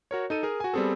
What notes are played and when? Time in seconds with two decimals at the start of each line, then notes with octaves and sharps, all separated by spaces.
0.11 F#4 A#4 C#5
0.30 D#4 A4 D#7
0.43 G#4 A#4
0.60 F#4 G#5
0.73 G3 B3 C4 G#4 A4